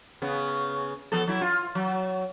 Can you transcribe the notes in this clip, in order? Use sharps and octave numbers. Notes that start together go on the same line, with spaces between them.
C#3 B3
F3 B3 A4
F#3 E4
F4
F#3